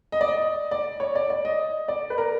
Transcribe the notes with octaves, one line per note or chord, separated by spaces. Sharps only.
D#5
D5
D#5
D5
C#5
D5
D5
D#5
D5
B4
A#4